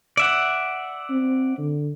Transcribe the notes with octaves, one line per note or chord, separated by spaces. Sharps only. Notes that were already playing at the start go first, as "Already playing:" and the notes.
D5 E5 F#5
C4
D3